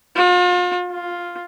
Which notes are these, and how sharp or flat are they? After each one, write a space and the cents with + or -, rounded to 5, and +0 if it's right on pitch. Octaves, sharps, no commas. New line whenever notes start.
F4 +40
F4 +5